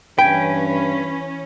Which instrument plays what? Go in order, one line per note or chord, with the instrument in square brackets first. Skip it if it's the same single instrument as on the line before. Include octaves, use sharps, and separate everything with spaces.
[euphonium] G2 [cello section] E3 C#4 [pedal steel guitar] B4 G#5 [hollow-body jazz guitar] G5